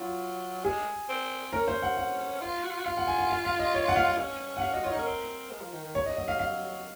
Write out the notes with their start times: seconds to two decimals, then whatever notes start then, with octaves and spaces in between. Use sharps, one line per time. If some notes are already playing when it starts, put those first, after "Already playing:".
Already playing: F#3 F4
0.65 G#3 G#4
1.10 C4
1.53 C#4 A#4
1.68 C5
1.82 F#5
1.97 F#5
2.41 F4
2.64 F#4
2.71 F4
2.79 F#4
2.86 F4 F5
2.97 F#5
3.07 G#5
3.19 F#5
3.30 F5
3.45 F5
3.59 D#5
3.74 C#5
3.88 F#5
3.96 F5
4.07 F#5
4.18 C#4
4.57 F#5
4.62 F5
4.73 F#4 D#5
4.83 F4 C#5
4.90 D#4
4.95 C#4 A#4
5.07 C4
5.51 G#3
5.62 F3
5.73 D#3
5.83 D#3
5.95 C#5
6.06 D#5
6.17 F#3 D#5
6.28 F#3 F5
6.39 F5